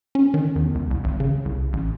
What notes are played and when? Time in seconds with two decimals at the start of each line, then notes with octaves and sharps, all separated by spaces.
0.15 C#4
0.34 D#3
0.56 E2
0.75 C#2
0.91 C2
1.04 G#1
1.20 C#3
1.45 C2
1.73 A1